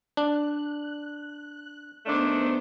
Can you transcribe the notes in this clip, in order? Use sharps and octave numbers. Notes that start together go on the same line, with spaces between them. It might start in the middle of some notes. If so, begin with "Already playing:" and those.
D4 F#6
D#3 A3 B3 D4 C5